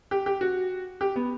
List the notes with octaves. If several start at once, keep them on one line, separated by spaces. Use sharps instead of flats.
G4
G4
F#4
G4
B3